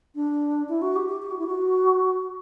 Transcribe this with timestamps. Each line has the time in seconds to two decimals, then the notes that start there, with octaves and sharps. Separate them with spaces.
0.15 D4
0.68 E4
0.82 F#4
0.95 G4
1.08 G4
1.22 G4
1.30 F#4
1.39 E4
1.46 F#4